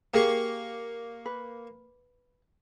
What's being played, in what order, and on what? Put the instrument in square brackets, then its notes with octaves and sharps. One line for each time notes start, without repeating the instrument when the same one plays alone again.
[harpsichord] A#3 C#6 [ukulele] G4 G#4 A#4
[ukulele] B4